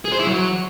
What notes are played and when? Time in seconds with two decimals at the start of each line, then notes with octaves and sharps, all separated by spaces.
0.05 G#4
0.12 C5
0.19 E4
0.27 F#3